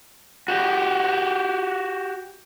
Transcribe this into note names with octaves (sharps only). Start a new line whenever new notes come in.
F#4 G4